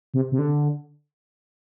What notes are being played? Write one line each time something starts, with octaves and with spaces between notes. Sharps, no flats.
C3
C3
D3